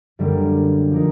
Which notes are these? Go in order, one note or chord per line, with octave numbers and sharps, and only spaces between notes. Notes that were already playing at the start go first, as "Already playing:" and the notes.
F#2 D3 G3 A#3 D4
F3 A#3 D#4